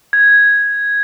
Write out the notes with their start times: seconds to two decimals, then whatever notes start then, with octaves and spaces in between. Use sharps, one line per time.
0.13 G#6